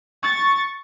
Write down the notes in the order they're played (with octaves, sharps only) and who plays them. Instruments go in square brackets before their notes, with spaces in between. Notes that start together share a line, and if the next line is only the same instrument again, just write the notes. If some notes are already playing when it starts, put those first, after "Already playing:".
[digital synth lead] C#6 [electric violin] A6